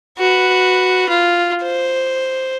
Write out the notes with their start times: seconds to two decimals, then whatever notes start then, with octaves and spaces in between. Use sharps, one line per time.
0.19 F#4 B4
1.09 F4
1.63 C5